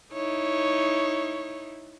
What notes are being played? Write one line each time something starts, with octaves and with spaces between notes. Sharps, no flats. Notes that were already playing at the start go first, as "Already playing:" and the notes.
D#4 E4 C#5